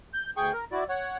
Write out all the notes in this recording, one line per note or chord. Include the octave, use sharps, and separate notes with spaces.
G6
D2 G#4 G5 C#6
A#4
E4 F#4 D5
C#5 F#5